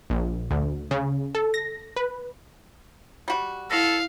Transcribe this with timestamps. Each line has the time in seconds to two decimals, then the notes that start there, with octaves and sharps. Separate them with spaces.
0.10 A#1
0.51 D2
0.91 C#3
1.35 A4
1.54 A#6
1.96 B4
3.28 G3 F#4
3.71 E4 A4 F5 A#6